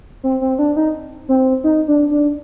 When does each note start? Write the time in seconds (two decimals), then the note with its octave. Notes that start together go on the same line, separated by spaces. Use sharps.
0.24 C4
0.41 C4
0.59 D4
0.76 D#4
1.29 C4
1.64 D#4
1.88 D4
2.11 D4